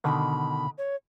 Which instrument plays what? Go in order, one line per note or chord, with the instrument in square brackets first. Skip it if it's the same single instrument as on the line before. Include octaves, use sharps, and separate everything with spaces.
[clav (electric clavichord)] B2 D3 D#3 [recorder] B5
[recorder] C#5